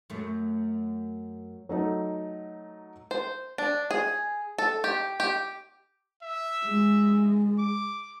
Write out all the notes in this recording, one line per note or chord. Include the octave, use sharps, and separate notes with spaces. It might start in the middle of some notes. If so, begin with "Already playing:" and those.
F#2 A3
F#3 A3 D#4
C5
D4
G#4
A4
G4
G4
E5
G#3
D6